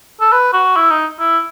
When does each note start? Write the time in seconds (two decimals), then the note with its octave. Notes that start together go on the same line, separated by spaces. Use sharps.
0.20 A4
0.32 B4
0.53 F#4
0.76 E4
0.91 D#4
1.20 E4